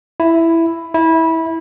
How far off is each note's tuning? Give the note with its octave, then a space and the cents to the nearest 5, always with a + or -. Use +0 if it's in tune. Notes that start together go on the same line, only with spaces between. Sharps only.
E4 +5
E4 -20